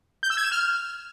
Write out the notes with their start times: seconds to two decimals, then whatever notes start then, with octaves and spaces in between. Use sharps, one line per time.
0.23 G6
0.30 E6
0.37 G#6
0.44 E7
0.52 F6